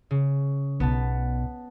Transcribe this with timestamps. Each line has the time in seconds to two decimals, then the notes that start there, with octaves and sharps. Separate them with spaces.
0.11 C#3
0.80 B1 B2 B3 A5